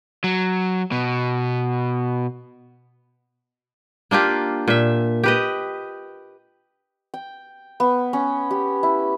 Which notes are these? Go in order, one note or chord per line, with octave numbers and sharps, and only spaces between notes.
F#3
B2
A#3 D4 F4 G4
A#2 E5
G4 B4 D#5
G5
B3
C#4
G4
E4